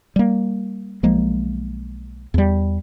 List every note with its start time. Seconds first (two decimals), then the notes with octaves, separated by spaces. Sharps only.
0.16 G3 A#3
1.03 B1 F3 G#3 A#3
2.34 E2 G3